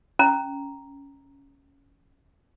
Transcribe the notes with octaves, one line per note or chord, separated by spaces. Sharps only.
C#4 A#5